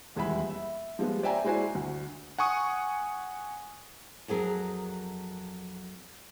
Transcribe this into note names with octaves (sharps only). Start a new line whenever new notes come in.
D#1 E2 G#3 G#4 E5 B5
E5
F3 G3 G#3 B3
C5 D5 E5 G5 G#5 A#5
G#3 E4 F#4 C5 D5 G#5
D2
F#5 G#5 C#6 D#6
F2 F#3 G#4 A#4